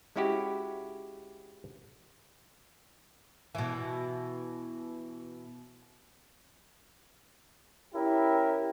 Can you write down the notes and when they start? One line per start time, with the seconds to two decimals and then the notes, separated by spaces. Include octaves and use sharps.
0.16 G#3 C#4 E4 F#4 G4
3.55 B2 E3
7.95 C#4 E4 G4 A#4